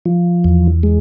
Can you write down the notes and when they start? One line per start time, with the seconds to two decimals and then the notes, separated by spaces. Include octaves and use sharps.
0.05 F3
0.44 E2
0.83 G#3